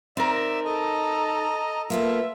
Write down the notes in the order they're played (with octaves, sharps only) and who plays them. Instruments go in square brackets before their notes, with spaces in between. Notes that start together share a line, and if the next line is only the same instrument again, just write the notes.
[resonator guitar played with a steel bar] C4 A#4 [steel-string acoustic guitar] D#4 [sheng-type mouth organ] D5 E5
[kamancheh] A4 A#5 [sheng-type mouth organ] D#5
[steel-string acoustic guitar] A#3 B3 A4 [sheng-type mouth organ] F4 [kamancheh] E5